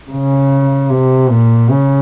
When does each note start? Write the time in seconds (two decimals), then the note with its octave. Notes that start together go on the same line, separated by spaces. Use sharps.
0.11 C#3
0.90 C3
1.29 A#2
1.70 C#3